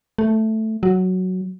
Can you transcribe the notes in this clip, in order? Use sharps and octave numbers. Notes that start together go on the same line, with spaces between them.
A3
F#3